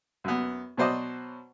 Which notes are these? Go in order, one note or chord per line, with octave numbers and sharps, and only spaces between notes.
F#2 B3
B2 F#3 C5 D5 D#5